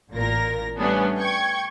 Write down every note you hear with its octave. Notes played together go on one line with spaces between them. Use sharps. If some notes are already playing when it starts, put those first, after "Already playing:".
A1 A#2 A#4 A#6
G3 A3 B3 C#4 D4
G5 C#6 G#6